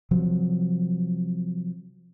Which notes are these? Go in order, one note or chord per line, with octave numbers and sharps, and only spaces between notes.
C3 F3 F#3